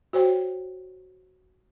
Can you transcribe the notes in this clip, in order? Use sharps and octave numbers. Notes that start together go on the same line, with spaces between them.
F#4 C5 C#5 G5